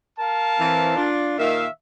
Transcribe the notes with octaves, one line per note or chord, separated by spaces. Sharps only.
A#4 F5 A5
E3 C4
D4 F4
A#2 D#3 E5 F5